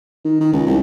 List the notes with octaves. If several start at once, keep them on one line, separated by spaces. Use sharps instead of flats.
D#3
D#3
C#2
C2